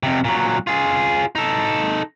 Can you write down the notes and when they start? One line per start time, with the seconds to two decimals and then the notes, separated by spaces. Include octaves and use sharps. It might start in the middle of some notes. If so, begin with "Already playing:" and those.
0.03 F2 C3
0.25 A#2 F#3
0.67 F4 G#4
1.35 D#4 A4